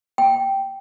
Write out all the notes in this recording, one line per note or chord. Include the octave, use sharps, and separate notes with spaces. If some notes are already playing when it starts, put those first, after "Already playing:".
G5